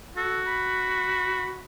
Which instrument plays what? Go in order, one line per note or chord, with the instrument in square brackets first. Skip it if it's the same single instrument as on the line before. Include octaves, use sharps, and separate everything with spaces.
[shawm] F#4 [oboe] A4
[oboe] B5